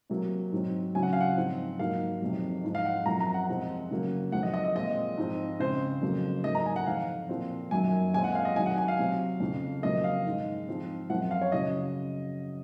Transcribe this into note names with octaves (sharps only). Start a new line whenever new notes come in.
C3 F#3 A#3
G#2 F#3 C4
C#3 F#3 C4 G#5
F#5
F5
F#5
G#2 F3 C4
G#2 F#3 A#3 F5
F2 C3 D#3 F#3
G#2 F3 G#3
F5
F#5
F#2 F3 C4 A#5
A#5
F#5
C3 F3 G#3 C4
C#3 F#3 A#3
F2 D#3 F#3 F#5
D#5
D#5
D#5
A#2 G#3 C4 D#5
G#2 F3 C4
C#3 G#3 C4 C5
F2 C#3 F#3 A#3
G#2 F#3 A#3 D#5
A#5
G#5
F#5
F2 C3 D#3 F5
A#2 F3 C4
F#2 D#3 F#3 A#3 G#5
A#2 G#3 C4 G#5
F#5
F5
D#5
C3 D#3 F#3 G#5
F#5
G#5
F5
C3 F#3 C4
F2 C#3 F3
F2 C#3 F#3 A#3 D#5
F5
G#2 D#3 G#3
G#2 F3 C4
F#2 F3 C4 F#5
F5
C#5
C#3 F#3 D#5